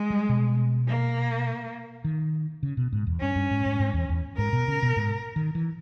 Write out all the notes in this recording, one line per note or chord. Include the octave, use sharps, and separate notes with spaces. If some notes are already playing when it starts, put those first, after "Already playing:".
Already playing: G#3
G3
B2
A#3
D#3
C#3
B2
G#2
E2
G2 C#4
G2
G#2
G#2
G#2
E2
E2
G#2 A#4
B2
C#3
B2
G#2
D#3
E3